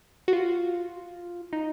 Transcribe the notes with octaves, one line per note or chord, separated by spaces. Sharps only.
F#4
F4
D#4